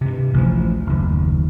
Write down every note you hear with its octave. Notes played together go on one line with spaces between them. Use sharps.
G2 C3
A1 D2 D#3 F3
F#1 D#2